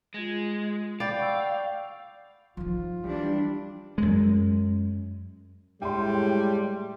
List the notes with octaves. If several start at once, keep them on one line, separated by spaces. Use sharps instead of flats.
G#3 F4 G#6 A#6
D5 F5 G5 B5
F#5 C#6 E6
F3 D#4 F4
E3 G3 D4
F#2 G#3
A2 G3 G#3 G5 C6